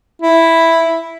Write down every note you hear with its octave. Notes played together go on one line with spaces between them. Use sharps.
E4